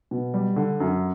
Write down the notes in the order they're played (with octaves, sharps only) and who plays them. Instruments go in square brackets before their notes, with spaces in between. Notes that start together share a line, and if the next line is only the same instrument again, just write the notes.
[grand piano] B2
G3
D3
F#2